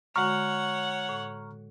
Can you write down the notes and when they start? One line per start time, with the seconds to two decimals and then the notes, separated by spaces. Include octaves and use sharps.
0.16 D3 G#3 F#4 C#5 F#5 A#5 C#6 F6
1.09 A2